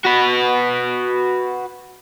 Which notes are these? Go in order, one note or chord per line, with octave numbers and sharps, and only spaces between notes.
F#4 B4